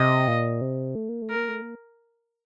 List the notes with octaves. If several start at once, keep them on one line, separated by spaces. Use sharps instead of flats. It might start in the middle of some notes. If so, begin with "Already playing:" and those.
Already playing: C3 D#5
A#2
C3
A3
A#3
A3
A#4
A#3
A3
A#3